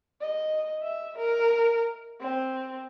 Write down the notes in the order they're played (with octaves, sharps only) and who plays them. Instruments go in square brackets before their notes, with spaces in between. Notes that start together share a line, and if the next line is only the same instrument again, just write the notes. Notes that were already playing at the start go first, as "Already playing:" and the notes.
[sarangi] D#5
E5
A#4
C4